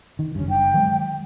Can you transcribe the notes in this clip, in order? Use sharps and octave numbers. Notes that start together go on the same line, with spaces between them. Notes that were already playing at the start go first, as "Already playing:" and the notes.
D#3
F#1 G2 C#4
G5
D#3 F#3 G#3